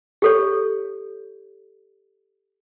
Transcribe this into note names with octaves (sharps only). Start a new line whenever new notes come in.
G4 A4 C#5